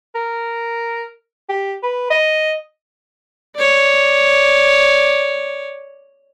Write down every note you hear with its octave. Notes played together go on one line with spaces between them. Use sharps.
A#4
G4
B4
D#5
C#5 D5